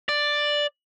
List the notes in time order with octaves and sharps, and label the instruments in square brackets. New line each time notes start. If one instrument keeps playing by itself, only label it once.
[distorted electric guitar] D5